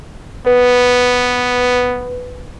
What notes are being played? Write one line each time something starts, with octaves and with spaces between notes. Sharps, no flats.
B3 B4